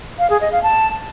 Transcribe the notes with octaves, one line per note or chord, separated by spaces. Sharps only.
F5
G#4
D#5
F5
A5